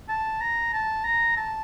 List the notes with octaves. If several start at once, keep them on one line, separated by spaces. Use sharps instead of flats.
A5
A#5
A5
A#5
A5